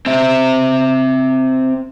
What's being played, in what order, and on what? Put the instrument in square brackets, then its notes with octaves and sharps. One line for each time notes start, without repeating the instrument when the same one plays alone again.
[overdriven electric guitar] C4 E5